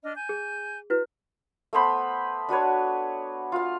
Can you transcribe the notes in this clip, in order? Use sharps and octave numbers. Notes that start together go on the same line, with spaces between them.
D4 D#5 F6
G#5 G6
G#4
E4 F#4 B4
A3 B3 C5 B5
D4 F#4 B4 C#5
F4 F5